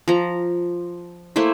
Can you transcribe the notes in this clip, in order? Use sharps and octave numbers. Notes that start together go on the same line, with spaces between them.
F3 A#5
A3 A#3 E4 C5